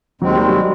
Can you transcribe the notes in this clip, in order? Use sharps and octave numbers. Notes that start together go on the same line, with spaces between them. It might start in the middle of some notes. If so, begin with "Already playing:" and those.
D#2 D#3 F#3 G#3 C4
G3
F#3